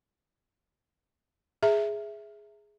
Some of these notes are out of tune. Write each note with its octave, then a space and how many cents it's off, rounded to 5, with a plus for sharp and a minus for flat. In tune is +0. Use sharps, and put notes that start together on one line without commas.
G#4 +0 E5 +0 A#5 -25